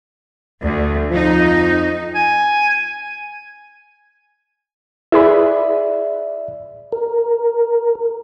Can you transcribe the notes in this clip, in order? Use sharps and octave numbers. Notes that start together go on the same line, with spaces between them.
D2
F2 F3 D#4
G#5
E4 G#4 B4 D5 E5
A#4